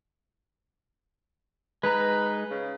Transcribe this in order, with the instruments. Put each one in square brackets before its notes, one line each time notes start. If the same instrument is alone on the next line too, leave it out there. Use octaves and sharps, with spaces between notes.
[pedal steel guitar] G#3 D#4 A#5 [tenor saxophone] B4
[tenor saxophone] C#3